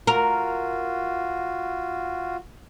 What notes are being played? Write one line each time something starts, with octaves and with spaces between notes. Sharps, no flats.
F4 F#4 A#4